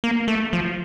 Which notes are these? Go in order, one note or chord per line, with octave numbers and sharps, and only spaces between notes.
A#3
A3
F3